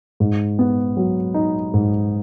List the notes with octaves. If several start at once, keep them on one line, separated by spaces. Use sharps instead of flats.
G#2
B3
F#3
D#4
G#2